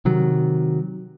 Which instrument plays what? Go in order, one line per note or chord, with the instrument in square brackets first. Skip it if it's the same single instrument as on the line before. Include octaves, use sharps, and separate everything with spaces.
[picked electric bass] C3 D#3 F#3